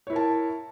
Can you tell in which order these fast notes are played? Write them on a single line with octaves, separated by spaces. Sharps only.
C#5 E4 A#4 A5